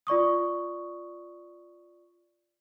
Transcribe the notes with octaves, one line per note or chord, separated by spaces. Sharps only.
F4 D5 C#6 D#6